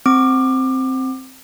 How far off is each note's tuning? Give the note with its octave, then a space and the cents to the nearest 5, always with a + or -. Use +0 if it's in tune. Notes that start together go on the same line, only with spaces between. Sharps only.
C4 +0 D6 +25